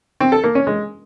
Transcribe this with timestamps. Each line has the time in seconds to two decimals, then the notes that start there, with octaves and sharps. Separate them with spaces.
0.20 C4
0.32 A4
0.44 A#3
0.55 C#4
0.67 G#3